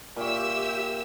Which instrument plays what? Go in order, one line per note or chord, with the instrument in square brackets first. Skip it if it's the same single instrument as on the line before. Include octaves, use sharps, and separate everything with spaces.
[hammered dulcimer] A#2 C#5 [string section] G4 E5 E6